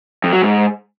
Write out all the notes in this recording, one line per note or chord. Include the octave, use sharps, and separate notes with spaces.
F2
F#3
G#2